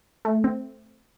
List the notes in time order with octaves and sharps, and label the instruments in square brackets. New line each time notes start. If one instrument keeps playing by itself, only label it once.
[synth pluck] A3
C4